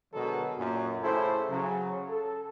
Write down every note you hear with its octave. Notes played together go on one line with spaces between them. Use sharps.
B2 D3 F#3 G#3 A4 A#4
F#2 A#2
A2 C#3 E4 A4 C5
C#3 F#3
A4